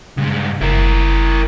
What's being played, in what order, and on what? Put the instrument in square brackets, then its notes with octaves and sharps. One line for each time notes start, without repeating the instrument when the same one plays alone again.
[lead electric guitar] G2 G#3 [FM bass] C#3
[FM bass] F#1 [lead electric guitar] E4 A#4